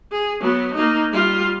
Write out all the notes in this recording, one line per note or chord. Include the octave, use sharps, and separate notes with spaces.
G#4
F#3 B3
A#3 D#4
G3 F4